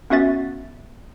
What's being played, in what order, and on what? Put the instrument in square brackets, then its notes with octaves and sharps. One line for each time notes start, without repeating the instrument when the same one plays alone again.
[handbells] B3 C#4 F#4 E5 A6